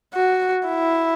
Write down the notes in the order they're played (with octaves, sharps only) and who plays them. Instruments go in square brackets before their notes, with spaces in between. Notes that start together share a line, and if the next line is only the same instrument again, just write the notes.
[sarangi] F#4
E4